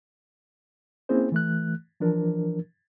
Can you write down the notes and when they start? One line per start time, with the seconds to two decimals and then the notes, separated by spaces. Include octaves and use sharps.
1.09 A#3 C4 C#4 E4 G#4 C5
1.32 E3 A3 F#6
2.00 E3 F3 D4 A#4